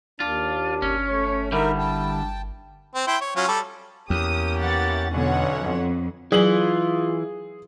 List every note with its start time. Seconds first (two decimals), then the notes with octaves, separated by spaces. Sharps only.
0.20 D#2 D4 F4
0.82 G1 C#4
1.09 A3 C#5
1.52 D3 G3 D#4 E4 A#4 E5
1.78 G5 A5
2.95 C4
3.07 E4 G5 C6
3.21 C#5
3.36 F#3 C#4 F4
3.48 G3 A4
4.10 E2 A#3 C#4 G4 D#6
4.59 E3 E4 F#5 A6
5.12 B1 B2 D3 C#4 C#5 F#5
5.60 F2
6.32 E3 F#3 F4 G#4 F#7